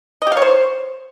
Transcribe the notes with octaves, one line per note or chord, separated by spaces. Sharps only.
D#5
G4
F5
C#5
C5